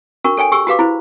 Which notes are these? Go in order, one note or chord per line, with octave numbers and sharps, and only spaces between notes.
D4 F#4 A#4 C#6
A4 C#5 G5 G#5
G4 G#4 C#6 E6
F#4 G4 B4 F5 D6
E4 C5 B5